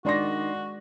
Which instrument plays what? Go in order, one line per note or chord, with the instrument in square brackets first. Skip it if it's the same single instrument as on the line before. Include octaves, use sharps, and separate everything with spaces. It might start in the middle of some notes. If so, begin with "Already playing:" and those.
[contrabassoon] D#3 [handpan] G#3 D5 [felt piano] D4 C6 A#6 [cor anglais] F#4